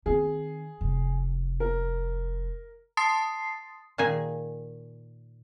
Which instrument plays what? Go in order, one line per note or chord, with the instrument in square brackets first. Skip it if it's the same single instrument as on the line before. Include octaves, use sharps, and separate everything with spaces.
[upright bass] D#3 C4 [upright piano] G#4
[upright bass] F1
[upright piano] A#4
[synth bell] A5 C6 D#6 A6 C7
[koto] A#2 D#3 G#4 G#5